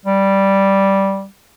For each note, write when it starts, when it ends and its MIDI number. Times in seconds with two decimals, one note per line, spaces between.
0.05 1.26 55